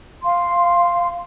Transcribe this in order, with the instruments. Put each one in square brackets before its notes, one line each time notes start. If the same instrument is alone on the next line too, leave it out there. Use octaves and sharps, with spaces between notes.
[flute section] F5 C6